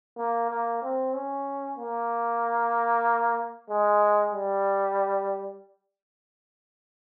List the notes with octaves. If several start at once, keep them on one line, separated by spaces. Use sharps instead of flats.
A#3
A#3
C4
C#4
A#3
G#3
G3